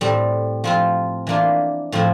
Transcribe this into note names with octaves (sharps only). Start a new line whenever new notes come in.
A2 G3 C4
F3 C4 F4
E3 A#3 D4 F4
A2 F3 C4 E4